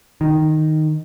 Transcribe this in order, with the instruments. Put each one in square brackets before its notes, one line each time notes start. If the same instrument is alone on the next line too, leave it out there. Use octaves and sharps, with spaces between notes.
[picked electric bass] D#3